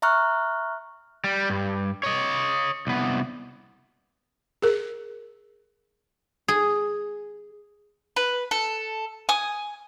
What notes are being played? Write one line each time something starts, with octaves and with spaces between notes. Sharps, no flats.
E5 A#5 C#6 F6 F#6
G3
G2
C#5 D#5
C2 B3
G#4 A#4
G#4
B4
A4
G#5 D#6